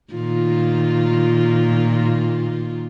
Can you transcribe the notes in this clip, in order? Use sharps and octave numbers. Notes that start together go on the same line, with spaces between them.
A#2 D#3 F4